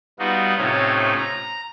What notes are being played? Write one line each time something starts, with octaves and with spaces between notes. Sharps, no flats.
G3 B3 D#4 F4 F#4
A2 C3 C#4 D#4 F4
A#5